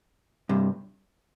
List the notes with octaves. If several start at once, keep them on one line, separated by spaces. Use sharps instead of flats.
G2 C3